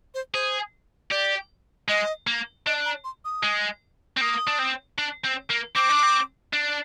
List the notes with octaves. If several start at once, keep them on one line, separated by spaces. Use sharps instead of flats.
C5
G#4 C5
G4 D5
G#3 D#5
A#3
D4 D#5
A#5
C6
D#6
G#3
C4
A#3 D#6
D4
C4
D4
C4
A#3
C4 D6
D4
C4
D4